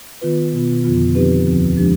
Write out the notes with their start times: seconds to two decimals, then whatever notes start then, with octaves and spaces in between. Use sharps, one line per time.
0.21 D#3 B3 F4 B4
0.53 B2 B3 F4
0.84 F2 D3 F3 B3 F4
1.15 F3 C4 D#4 G4 B4
1.46 D#2 D3 F3 C4
1.77 F3 G#3 D4 G4